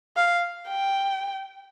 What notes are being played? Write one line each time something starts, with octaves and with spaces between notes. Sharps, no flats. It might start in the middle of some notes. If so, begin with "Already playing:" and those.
F5
G5